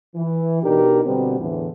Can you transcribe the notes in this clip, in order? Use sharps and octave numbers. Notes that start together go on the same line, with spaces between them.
E3
B2 D4 D#4 G4 A#4
B2 D3 G3 B3 C4
E2 A2 D3 E3